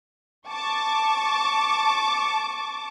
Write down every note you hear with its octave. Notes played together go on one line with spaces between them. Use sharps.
A5 C#6 D6